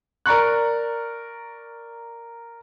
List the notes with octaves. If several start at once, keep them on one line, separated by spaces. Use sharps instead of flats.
A#4 D5 A#5 C#6 F#6